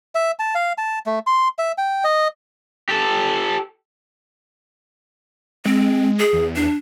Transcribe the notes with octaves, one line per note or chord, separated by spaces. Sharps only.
E5
A5
F5
A5
A3
C6
E5
G5
D#5
G4 A4
G#3 C4
G#4
E2
D4